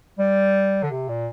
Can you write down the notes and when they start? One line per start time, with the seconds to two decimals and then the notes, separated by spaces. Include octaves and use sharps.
0.19 G3
0.83 D3
0.91 C3
1.08 A#2